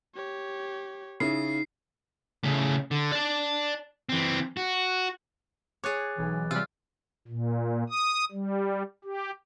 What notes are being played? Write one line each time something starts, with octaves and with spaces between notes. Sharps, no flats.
G4 C#5
C#3 D#4 E4 C7
A2 C#3
D3
D5 A5
E3 C4
F#4
G#4 C#5 D6 F#6 A6
B1 E3
C3 G3 F4 E6 F6
A#2
D#6
G3
G4